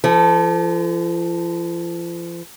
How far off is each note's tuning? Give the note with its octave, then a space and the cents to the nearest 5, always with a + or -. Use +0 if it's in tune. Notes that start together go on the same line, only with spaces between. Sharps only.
F3 -40 A4 +0